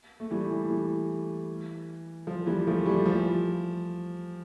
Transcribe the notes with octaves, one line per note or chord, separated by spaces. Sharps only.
A3
E3 G3
E3
E3
F3
E3 G3
F3 A3
E3 G3
E3
F3